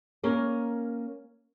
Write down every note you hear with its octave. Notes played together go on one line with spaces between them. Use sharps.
A#3 C#4 A#4